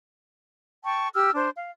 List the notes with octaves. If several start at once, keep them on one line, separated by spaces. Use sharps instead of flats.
G5 A5 C#6
G4 E6 F6
D4 C5
F5